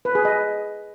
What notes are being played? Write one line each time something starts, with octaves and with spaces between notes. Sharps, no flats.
B4
G#4
D#5